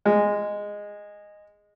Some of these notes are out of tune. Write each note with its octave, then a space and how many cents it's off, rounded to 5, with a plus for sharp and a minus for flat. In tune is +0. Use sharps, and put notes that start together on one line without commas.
G#3 -10